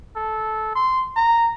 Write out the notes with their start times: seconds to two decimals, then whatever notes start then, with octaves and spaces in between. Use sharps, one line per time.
0.16 A4
0.75 C6
1.16 A#5